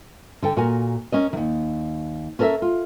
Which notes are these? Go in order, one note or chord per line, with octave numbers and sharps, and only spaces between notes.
D3 A4 G5
A#2 F#4 A#4 G#5
C#4 A#4 D#5
D#2 D#3
C#4 A4 A#4 C#5 E5
F4